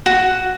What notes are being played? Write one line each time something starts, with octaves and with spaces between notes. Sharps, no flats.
F#4